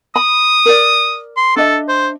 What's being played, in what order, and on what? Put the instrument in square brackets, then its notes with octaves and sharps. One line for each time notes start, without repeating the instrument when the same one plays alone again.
[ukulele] B5 [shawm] D#6
[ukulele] A#4 D5
[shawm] C6
[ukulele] D4 D#5 E5 [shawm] A4
[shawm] C5